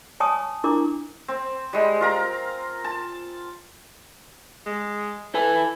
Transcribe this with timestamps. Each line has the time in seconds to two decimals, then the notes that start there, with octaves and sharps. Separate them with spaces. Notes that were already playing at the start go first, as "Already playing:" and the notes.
0.20 C#5 G#5 A5 C#6 D#6
0.64 D4 E4 A#4 C#6 D6
1.28 C4
1.73 G3 G#3
2.01 F4 A#4 A#5
2.84 A5
4.66 G#3
5.34 E4 A4 B4 G#5